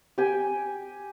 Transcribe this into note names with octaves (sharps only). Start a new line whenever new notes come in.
G4 G5 G#5